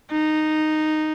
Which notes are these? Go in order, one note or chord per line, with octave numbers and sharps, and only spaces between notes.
D#4